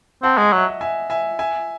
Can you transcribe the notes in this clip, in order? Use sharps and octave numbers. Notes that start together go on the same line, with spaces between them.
C4 F#5 A5
G#3 D#5
F#3 E5
F#5
E5 G#5
E5 G#5
E5 G#5